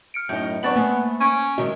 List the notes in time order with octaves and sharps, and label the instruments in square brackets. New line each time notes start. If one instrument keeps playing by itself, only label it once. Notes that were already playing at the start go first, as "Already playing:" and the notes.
[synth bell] F6 C#7 D7
[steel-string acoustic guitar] F#2 D#4 [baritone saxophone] A2 [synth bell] G6
[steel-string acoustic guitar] F#2 C4 D4 [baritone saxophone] B3 [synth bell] C#6 A6 F#7
[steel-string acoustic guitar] A3 C5 [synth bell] A#3 G#5
[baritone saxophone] C#4 [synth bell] D7 D#7
[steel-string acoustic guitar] C3 D#3 G#3 [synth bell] F#4 D#5